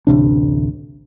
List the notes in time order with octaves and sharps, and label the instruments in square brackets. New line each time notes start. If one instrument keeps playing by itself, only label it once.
[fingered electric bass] A1 D2 C3 D4